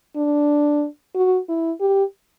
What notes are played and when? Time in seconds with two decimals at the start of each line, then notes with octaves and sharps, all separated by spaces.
0.16 D4
1.15 F#4
1.49 E4
1.81 G4